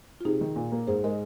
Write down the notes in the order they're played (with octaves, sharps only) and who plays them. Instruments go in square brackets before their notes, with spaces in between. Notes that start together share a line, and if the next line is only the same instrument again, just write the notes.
[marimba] F4
[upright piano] C3 [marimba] D#4 G#4
[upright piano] D#3
A#2
A#3
[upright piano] G#2 [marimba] G#4 C5
[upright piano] G#3 [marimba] A#4 D#5